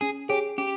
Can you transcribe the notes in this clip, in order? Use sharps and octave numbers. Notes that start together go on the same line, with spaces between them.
C#4 G#4
G4 G#4 C#5 G#5
C#4 G4